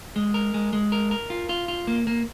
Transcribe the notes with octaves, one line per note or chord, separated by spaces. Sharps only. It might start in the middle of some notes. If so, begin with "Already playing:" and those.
G#3
A#4
G#3
G#3
A#4
A#4
F4
F4
F4
A#3
A#3